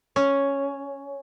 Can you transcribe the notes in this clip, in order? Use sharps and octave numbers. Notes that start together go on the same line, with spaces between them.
C#4